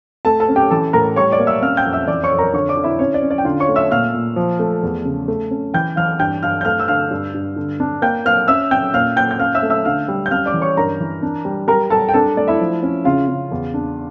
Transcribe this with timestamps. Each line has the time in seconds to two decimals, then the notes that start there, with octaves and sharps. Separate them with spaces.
0.25 A3 A4 A5
0.40 A4 A5
0.49 C#4
0.56 G4 G5
0.70 E3 A4 A5
0.93 A2 A#4 A#5
1.16 G3 C#5 C#6
1.32 D5 D6
1.39 A#3
1.47 E5 E6
1.62 C#4 F5 F6
1.77 G5 G6
1.85 F2
1.93 E5 E6
2.07 E3 D5 D6
2.23 C#5 C#6
2.31 F2
2.38 A#4 A#5
2.53 D3 C#5 C#6
2.69 D5 D6
2.77 D3
2.84 E4 E5
2.99 C#4 C#5
3.14 D5
3.22 C#4
3.31 D5
3.38 G5
3.45 D3 F4 F5
3.60 C#5 C#6
3.69 A3
3.76 E5 E6
3.91 A#2 F5 F6
4.14 A#2
4.36 F3
4.59 A3
4.83 E2
5.05 C#3
5.28 A3
5.51 C#4
5.74 E3 G5 G6
5.96 E3 F5 F6
6.19 G2 G5 G6
6.43 G2 F5 F6
6.61 G6
6.65 A3 F5 F6
6.80 E6
6.88 D3 F5 F6
7.11 G2
7.34 G2
7.56 D3
7.80 D4
8.02 A#3 G5 G6
8.25 A#3 F5 F6
8.48 C#4 E5 E6
8.71 C#4 G5 G6
8.93 A#2 F5 F6
9.16 A#2 G5 G6
9.31 G6
9.39 C#4 F5 F6
9.55 E5 E6
9.63 A3
9.70 E5 E6
9.85 D3 F5 F6
10.08 G3
10.26 G6
10.30 C#4 F5 F6
10.46 D5 D6
10.53 E3
10.61 C#5 C#6
10.77 G2 A#4 A#5
11.00 E3
11.22 D4
11.45 G3
11.68 G3 A#4 A#5
11.90 G3 A4 A5
12.09 G5
12.14 D4 A4 A5
12.37 A3 D5
12.48 E4 E5
12.60 F3
12.83 C#4
13.05 C#3 F4 F5
13.28 C#3
13.51 E2
13.74 D4